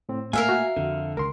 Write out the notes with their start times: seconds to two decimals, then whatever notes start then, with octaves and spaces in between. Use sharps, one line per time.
0.09 A2 C4
0.33 A#2 A3 A#3 A#4 E5 F5 G#5
0.49 F#4
0.76 F2 D3
1.17 C#2 A#4 C6